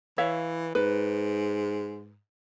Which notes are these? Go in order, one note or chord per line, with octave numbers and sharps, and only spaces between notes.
E3 C#5 E5 F5
G#2 B4